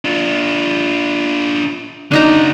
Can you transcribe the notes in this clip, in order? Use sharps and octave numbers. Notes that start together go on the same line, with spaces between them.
D4 F4
C#3 D4 D#4 F#4 A#5